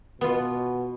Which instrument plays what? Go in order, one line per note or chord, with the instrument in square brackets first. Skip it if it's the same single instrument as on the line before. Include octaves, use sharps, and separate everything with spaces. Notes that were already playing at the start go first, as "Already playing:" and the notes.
[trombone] B2 [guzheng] B3 F4